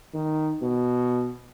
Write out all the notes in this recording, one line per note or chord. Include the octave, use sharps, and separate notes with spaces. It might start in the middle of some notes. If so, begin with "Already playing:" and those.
D#3
B2